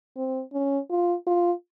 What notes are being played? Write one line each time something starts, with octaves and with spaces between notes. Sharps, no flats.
C4
C#4
F4
F4